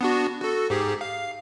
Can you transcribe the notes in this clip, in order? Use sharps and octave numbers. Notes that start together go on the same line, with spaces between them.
B3 D4 F#4
F#4 A4
G#2 G4 G#4
F5